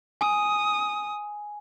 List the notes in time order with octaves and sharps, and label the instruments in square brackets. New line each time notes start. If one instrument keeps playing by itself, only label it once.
[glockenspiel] G#5 [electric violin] D#6